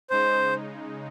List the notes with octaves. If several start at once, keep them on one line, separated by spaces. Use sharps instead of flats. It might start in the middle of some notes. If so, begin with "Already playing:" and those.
C#3 G#3 D#4 C5